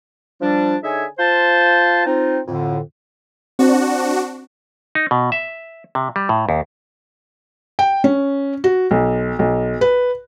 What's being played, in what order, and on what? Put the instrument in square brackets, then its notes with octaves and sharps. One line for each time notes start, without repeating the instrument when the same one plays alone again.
[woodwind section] F3 G3 D4
D3 D#4 G#4 C#5 E5 G#5
F4 C5 A5
C4 D#4 F4
F2 A2 D3
[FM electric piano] C4 C5 [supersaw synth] D4 F#4
[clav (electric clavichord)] D#4
B2
E5
C3
G3
A2
D#2
[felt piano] G5
C#4
F#4
B1
B1
B4